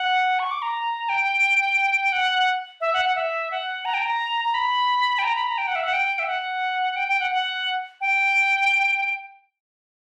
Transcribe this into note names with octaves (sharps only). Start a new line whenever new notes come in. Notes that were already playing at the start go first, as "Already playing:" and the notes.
Already playing: F#5
C#6
D6
A#5
G5
F#5
E5
F#5
F#5
E5
F#5
A#5
G5
A#5
A#5
B5
G5
A#5
B5
A#5
G5
F#5
E5
F#5
G5
E5
F#5
G5
G5
F#5
F#5
G5